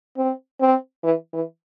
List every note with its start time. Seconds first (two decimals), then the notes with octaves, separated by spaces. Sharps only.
0.17 C4
0.60 C4
1.04 E3
1.33 E3